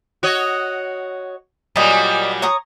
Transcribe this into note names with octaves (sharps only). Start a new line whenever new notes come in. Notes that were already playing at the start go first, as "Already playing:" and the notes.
F#4 C#5 D#5
A#2 F#3 G3 D5 D#5
C#5 A#5 D#6